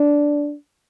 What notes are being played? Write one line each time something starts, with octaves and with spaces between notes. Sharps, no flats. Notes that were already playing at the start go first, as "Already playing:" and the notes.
Already playing: D4